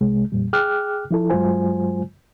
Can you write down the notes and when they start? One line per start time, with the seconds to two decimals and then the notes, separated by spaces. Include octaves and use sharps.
0.01 C2 C3 G#3
0.32 F2 A#2 G3
0.53 G#4 G5 D6 F6 F#6
1.11 F3 E4 A4
1.30 G2 F#3 G#3 F4 C5 G#5